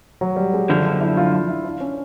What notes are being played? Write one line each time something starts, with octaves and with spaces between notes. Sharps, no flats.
F#3
G3
G#3
F#2 D3 F3 D4
E4
F4
F4
E4
D4
C#4